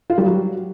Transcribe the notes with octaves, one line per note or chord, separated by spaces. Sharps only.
F4
G3
F#3